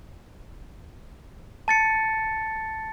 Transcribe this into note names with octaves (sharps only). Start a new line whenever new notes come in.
A5 A6 C#7